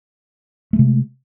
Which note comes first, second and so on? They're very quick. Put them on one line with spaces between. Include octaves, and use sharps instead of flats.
A3 G#3 C3